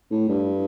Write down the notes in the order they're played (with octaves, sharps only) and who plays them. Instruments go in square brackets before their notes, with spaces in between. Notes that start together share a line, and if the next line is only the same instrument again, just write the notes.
[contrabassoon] A2
G2